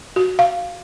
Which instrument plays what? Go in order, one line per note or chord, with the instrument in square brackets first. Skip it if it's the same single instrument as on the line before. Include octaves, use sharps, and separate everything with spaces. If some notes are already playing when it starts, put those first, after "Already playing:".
[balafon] F#4
F5